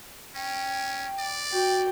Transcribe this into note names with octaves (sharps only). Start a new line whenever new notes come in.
C#4 G5
D5
F#4 G5